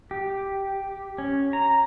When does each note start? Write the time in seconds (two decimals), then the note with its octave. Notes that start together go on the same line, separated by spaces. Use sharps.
0.11 G4
1.18 C#4
1.53 A#5